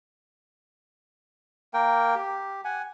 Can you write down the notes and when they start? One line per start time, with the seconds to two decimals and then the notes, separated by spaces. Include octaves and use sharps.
1.74 A#3 A#4 G5
2.15 G4
2.65 F#5 G#5